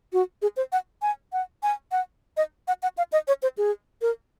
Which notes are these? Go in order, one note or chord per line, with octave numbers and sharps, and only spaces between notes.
F#4
G#4
C5
F#5
G#5
F#5
G#5
F#5
D#5
F#5
F#5
F5
D#5
C#5
C5
G#4
A#4